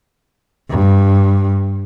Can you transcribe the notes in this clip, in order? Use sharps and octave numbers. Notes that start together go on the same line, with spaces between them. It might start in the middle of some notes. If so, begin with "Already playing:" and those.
G2